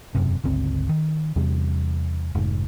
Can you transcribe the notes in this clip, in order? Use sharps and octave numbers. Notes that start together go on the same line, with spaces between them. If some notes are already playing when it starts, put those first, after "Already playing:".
E1 F#2 C3
G1 C#2 C4
D#3
E2 C3 G3
F1 G#2